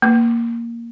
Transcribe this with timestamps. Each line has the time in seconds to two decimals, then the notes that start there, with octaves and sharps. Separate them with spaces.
0.02 A#3